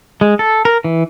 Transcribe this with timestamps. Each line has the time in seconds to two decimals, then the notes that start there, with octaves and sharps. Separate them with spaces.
0.21 G#3
0.39 A4
0.65 A#4
0.84 E3